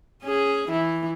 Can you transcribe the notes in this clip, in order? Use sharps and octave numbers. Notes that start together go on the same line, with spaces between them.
C#4 G#4
E3 E4